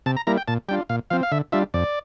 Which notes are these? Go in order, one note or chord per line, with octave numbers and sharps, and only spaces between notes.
C3 A5
A#5
G3 A#3 E4 A#5
G5
A#2 A5
G3 D4 F4 G5
A#2 F5
F3 C4 F5
F5
D3 E5
G3 D4 F4 E5
F2 D5